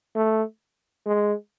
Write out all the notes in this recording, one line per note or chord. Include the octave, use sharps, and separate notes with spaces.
A3
G#3